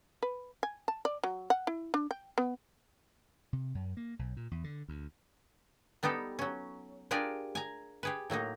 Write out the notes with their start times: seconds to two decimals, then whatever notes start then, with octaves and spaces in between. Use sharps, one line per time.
0.23 B4
0.63 G#5
0.88 A5
1.05 D5
1.24 F#3
1.50 F#5
1.67 E4
1.94 D4
2.11 G5
2.38 B3
3.53 C3
3.75 F#2
3.97 A#3
4.19 B1
4.37 A#2
4.51 E2
4.64 D3
4.88 D2
6.03 G3 B3 D#4 G4 A4
6.39 F#3 C#4
7.11 D4 F4 G4 G#4 A#4 D5
7.55 G#5 A#5
8.03 G4 G#4 B4
8.30 A2 F#3 A#3 D#4